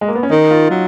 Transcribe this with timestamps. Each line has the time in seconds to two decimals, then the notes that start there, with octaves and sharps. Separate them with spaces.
0.01 G#3
0.08 A#3
0.15 B3
0.23 C#4
0.30 D#3 D#4
0.51 F4
0.70 F#3